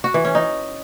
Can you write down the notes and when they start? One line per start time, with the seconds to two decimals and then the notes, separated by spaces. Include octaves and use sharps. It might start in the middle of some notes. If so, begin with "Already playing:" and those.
0.04 F#4
0.14 E3
0.25 C#4
0.35 D#4